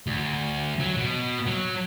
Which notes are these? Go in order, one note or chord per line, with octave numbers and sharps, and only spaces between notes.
D2
F#3
B2
F#3